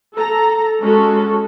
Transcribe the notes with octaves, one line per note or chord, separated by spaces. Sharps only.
A4 A#5
G#3 C#4 F#4 A4